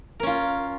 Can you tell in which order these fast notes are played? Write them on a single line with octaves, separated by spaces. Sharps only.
A#4 C#4 F4